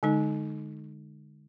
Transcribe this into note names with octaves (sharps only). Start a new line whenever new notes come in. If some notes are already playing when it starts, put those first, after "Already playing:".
D3 G#3 D#4